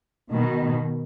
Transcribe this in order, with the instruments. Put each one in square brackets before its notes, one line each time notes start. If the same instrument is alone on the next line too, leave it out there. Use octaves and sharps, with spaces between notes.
[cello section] B2 D#3